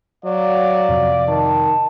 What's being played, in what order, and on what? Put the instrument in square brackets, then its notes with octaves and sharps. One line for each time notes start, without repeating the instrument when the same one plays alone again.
[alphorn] F#3 [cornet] D5 [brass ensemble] F5
[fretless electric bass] F2 C3
[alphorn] D#3 [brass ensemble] A5